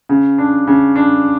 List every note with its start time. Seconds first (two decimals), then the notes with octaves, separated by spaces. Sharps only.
0.09 C#3
0.38 D4
0.67 C#3
0.96 D4